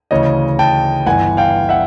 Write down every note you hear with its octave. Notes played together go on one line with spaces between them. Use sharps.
D2 C#3 E3 C#5 D#5
G5 A5
G1 G2 E3 F#5 G#5
F5 G5
E5 F#5